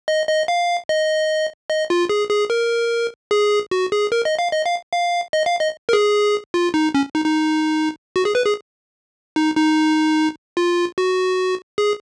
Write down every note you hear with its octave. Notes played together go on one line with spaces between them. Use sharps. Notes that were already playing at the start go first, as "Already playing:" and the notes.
D#5
D#5
F5
D#5
D#5
F4
G#4
G#4
A#4
G#4
F#4
G#4
A#4
D#5
F5
D#5
F5
F5
D#5
F5
D#5
A#4
G#4
F4
D#4
C#4
D#4
D#4
F#4
G#4
B4
G#4
D#4
D#4
F4
F#4
G#4